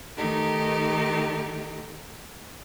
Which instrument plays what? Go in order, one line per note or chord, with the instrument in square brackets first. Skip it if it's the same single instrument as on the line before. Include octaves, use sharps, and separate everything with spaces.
[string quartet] D#3 A3 D#4 G4